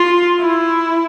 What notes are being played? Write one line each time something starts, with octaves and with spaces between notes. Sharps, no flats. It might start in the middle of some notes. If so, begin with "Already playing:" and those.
Already playing: F4
E4